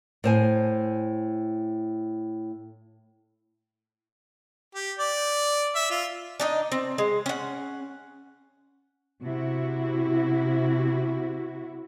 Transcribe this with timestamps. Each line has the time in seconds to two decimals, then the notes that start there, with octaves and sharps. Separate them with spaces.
0.24 A2 C5 G#5
4.75 G4
4.98 D5
5.75 E5
5.90 F4
6.40 D4 D#4 D#5
6.72 C4
6.98 G#3
7.26 C#4 F#5
9.23 C3 E4 F#4